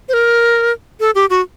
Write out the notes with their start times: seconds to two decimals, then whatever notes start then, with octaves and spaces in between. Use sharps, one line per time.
0.09 C5
0.14 A#4
1.00 A4
1.15 G4
1.30 F#4